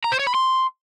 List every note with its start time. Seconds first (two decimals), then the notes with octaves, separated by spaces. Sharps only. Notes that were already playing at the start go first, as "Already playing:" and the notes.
0.04 A#5
0.12 C5
0.19 C#5
0.27 B5
0.34 C6